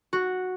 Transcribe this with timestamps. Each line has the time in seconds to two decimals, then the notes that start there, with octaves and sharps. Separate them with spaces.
0.13 F#4